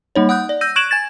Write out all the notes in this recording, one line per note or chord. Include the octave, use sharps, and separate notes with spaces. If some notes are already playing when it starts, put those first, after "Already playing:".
G3 A#3 D#4 C#5
F#5 D#6 F#6 G6
D5
E6 G6 A#6 D#7
C#6 F#6 G#6 D7 E7 F#7
G#5 G#6 A6